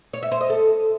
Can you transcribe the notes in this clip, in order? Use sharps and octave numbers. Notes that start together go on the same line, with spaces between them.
C#5
E5
C5
D#5
A4